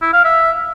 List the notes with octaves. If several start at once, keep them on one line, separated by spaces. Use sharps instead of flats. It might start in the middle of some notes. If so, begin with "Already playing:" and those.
E4
F5
E5